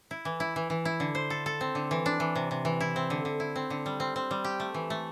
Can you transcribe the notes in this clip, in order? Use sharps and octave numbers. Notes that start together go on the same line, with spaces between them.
E4
E3
E4
E3
E3
E4
D3
C5
A4
A4
C4
D3
E3
D4
E3
C3
C3
E3
E4
C4
D3
D3
E4
C4
D3
G3
C4
C4
G3
G4
A3
E3
A3